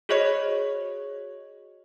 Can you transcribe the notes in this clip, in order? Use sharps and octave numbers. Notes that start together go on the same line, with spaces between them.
F#4 G#4 C5 C#5 D#5 C#6